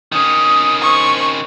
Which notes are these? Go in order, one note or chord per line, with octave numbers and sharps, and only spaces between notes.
D#3 C#4 D#6
C5 C#6